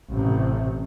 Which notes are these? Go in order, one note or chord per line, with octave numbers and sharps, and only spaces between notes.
A1 C3